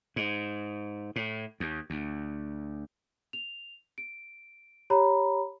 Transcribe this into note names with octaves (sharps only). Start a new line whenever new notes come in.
G#2
A2
D#2
D2
F7
D7
G4 C#5 A#5 B5